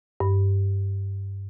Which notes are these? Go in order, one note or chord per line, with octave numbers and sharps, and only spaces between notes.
G2